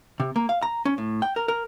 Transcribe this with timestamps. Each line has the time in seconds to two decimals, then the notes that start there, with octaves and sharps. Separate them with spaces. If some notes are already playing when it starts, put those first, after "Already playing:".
0.20 C3
0.36 A#3
0.49 F5
0.62 A#5
0.85 C#4
0.98 A2
1.22 G5
1.36 A#4
1.48 A#4